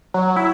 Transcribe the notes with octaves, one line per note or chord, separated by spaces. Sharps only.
F#3
E4